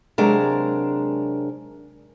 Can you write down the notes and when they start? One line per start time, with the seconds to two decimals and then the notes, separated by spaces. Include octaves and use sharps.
0.18 C3 F#3 G#3 D4 A#4